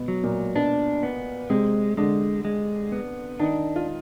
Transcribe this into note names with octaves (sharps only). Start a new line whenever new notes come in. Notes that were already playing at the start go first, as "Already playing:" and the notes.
Already playing: B2 B3
F#3
A#2 A#3
B2 B3 D4
B3
C3 G#3 C4
D3 G#3 D4
G#3
B3
D#3 D4 D#4
F4